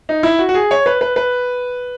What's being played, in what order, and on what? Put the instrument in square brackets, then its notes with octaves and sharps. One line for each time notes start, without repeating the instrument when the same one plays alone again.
[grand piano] D#4
E4
F#4
F#4
G#4
C#5
B4
B4
B4